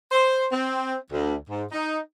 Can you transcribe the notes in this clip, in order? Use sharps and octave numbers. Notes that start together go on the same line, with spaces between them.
C5
C4
D2
G#2
D#4